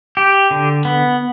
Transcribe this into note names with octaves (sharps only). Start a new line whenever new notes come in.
G4
D3
B3